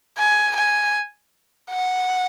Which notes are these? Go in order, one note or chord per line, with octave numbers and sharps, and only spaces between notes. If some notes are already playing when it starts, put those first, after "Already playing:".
G#5
G#5
F#5